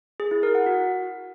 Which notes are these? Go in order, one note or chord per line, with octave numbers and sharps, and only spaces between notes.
G#4
E4
A#4
F#5
F#4